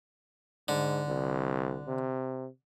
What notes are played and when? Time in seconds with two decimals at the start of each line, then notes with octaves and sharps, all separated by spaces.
0.68 G#2 D3
1.07 C2
1.88 C3